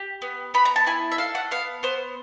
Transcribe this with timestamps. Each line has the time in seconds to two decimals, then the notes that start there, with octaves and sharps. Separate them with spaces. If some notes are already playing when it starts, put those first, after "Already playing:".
Already playing: G4
0.22 B3
0.54 B3 B5
0.65 A#5
0.76 A5
0.86 E4 G#5
1.12 E5
1.18 A4 F5
1.35 F#5
1.51 B3 F5
1.83 B3 C5